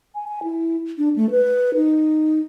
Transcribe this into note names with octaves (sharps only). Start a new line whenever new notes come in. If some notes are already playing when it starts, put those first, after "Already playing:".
G#5
G#5
E4
D4
A3
B4
D#4